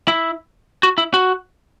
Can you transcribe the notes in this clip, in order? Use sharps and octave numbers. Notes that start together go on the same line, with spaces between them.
E4
F#4
E4
F#4